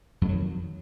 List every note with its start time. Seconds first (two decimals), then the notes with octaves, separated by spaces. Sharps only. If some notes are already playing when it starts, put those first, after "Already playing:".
0.21 F2
0.25 G#3
0.29 F#3
0.33 D#3